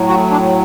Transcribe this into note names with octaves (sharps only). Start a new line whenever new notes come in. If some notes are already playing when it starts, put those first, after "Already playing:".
Already playing: A2 F#3
F#4
D4